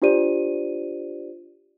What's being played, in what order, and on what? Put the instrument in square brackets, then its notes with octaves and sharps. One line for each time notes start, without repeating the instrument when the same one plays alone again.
[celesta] D4 F4 G4 C5 D5 D#7